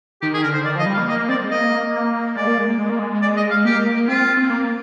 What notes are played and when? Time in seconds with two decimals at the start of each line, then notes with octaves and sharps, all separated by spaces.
0.22 D#3 G4
0.33 G#4
0.43 D3 A#4
0.54 C5
0.65 D#3 D5
0.76 F3 D#5
0.86 G3
0.93 F5
0.97 A#3
1.08 A#3 D#5
1.29 C4 D5
1.43 G#3
1.51 A#3 D#5
2.36 G#3 D5
2.47 A#3
2.58 G#3
2.67 A#3
2.78 G#3
2.90 A#3
2.99 G#3
3.22 D5
3.36 D#5
3.51 F5
3.65 A#3 G4
4.08 C4 F4
4.37 C4
4.50 A#3